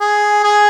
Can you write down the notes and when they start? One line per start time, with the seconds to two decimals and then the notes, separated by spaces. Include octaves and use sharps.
0.01 G#4
0.44 G#4